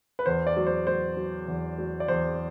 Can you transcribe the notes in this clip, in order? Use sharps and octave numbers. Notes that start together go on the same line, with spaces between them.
B4
E2 C5
D5
F#3
C5
F#3 C5
F#3
E2
F#3
D5
E2 C5